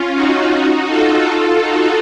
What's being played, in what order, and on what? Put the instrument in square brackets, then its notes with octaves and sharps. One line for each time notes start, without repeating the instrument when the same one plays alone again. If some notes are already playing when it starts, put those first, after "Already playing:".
Already playing: [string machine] C#4 F4
D#4 F#4
F4 A4
D#4 F#4